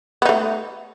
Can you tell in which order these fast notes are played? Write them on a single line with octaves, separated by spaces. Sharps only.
B3 D#4 A3